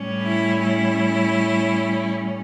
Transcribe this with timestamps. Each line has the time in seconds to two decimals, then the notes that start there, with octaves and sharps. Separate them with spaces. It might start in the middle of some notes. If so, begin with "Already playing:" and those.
Already playing: A2 G3 C#4
0.22 E4
0.62 E4